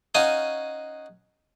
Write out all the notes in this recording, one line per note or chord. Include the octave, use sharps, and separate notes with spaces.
C#4 D#4 F#4 D#5 F5 G#5